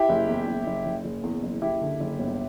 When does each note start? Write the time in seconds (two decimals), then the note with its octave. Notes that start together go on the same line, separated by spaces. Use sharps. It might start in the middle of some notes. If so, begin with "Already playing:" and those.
Already playing: E4 G4
0.09 F#1
0.28 E2
0.47 F#1
0.66 F#1
0.86 F#1
1.04 F#1
1.24 E2
1.43 F#1
1.62 F#1 E4 G4
1.81 D3
2.00 F#1
2.19 G1